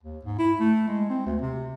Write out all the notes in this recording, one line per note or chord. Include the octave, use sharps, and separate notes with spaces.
D#2
G#2
E4
A3
G#3
C4
D2
C3